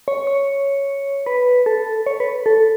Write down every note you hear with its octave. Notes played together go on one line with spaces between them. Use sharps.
C#5
C#5
B4
A4
C#5
B4
A4